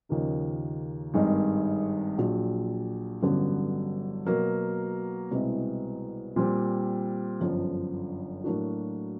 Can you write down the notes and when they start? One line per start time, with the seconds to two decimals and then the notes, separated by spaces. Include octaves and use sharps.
0.09 D#2 C#3 F3 A#3 D#4
1.14 G#1 G2 D#3 G#3
2.18 A#1 A#2 F#3
3.22 A1 G2 D3 F#3 B3
4.26 B2 F#3 A#3
5.31 C2 B2 G#3 C4 E4
6.36 A#2 G3 C4
7.40 G1 F#2 D3 F3
8.44 A2 F#3 A#3 D4 F#4